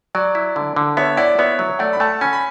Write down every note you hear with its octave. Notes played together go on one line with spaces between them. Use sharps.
F#3 D5
E4
D3
D3
B3 C#5 E5
E4 D5 F#5
B3 C#5 E5
F#3
A3 D5 F#5
B5
A3 F#5 A5
C#4 G#5 B5
B5